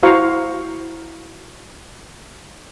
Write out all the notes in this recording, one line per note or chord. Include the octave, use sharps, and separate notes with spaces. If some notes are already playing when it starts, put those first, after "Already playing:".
E4 F#4 C5 F5 A#5 C#6